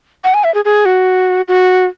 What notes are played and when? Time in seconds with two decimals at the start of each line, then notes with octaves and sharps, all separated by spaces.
0.24 F#5
0.34 G#5
0.44 E5
0.54 G#4
0.65 G#4
0.85 F#4
1.48 F#4